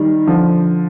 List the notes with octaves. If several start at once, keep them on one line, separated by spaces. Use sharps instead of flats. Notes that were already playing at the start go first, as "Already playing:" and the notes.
Already playing: D#3 G3
D3 F3